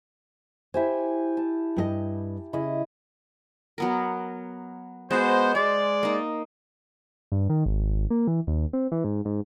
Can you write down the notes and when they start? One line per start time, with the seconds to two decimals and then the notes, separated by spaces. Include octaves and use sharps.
0.74 E4 G4 C5 E5 G#5
1.37 A5
1.76 G2 G#4 D#5
2.53 C#3 E4 D#5
3.78 F#3 B3 A#4
5.11 G#3 B3 F#4 C5
5.55 G#3 C5 D5
6.03 A#3 D#4
7.32 G2
7.50 D#3
7.66 G#1
8.10 A#3
8.27 E3
8.47 D#2
8.73 C4
8.92 E3
9.04 G#2
9.25 G#2